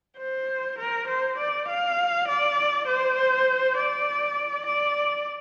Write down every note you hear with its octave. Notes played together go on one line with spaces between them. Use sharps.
C5
A#4
C5
D5
F5
D5
C5
D5
D5